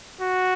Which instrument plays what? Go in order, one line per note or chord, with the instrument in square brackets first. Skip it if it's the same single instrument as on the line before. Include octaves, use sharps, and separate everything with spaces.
[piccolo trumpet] F#4